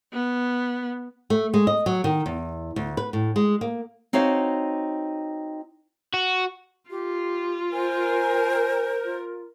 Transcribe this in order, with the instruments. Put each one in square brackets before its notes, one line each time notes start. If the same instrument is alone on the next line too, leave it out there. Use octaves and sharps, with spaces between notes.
[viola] B3
[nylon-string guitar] A3
G#3
D#5
F#3
D#3
E2
D2
B4
A2
G#3
A#3
C4 D#4 F#4 C#5 F5
[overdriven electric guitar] F#4
[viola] F4 [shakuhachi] G4
[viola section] A#4 [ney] C5 [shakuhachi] G#5
[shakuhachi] F4